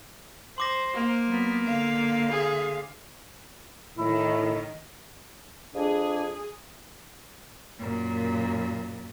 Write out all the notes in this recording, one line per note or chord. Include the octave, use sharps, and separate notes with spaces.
C5 C6 D6 A#6
A#3
F#3 B3
D3 F5
G#4
A2 D#3 E4
F2 D4 G#4
F#2 A#2